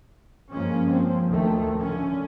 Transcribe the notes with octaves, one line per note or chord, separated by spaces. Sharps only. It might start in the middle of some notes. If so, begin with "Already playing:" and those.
G2 F3 G#3 A#3 C#4
F3 C4
D2 D#3 F3 A3
D3 C#4